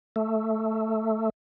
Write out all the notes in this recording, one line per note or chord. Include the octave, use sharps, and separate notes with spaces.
A3